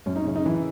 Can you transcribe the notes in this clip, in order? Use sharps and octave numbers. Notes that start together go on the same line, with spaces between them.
F#2 C#4
D#4
C#3 C#4
D#4
E3 E4